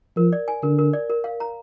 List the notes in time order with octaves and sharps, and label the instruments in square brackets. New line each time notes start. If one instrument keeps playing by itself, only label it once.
[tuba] F3 [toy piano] A#4
[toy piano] D5
G#5
[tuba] D3 [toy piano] A#4
[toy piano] A#4
D5
A#4
F5
A#5